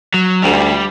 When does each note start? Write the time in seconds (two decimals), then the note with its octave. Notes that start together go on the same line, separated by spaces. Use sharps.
0.14 F#3
0.43 D2 G3